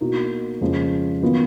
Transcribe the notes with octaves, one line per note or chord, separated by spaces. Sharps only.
B2 A#3 D#4 F#4
F2 C#3 F3 G#3
D#3 F#3 B3 F4